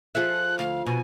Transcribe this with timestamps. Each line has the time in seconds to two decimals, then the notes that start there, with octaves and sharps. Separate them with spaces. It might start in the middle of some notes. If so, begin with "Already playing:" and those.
0.15 F3 F4 G#4 A4 E5 F#6
0.59 D2 F5
0.86 B2 G#5